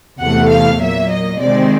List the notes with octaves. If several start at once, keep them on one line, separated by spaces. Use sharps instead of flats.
E2 C3 E3 A3 F#5
F5
A#2 F#3 A#3 E5
D#5
C3 D#3 G#3 C4 D5